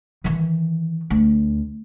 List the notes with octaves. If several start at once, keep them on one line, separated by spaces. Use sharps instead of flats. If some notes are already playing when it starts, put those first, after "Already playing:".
D#3 E3
D2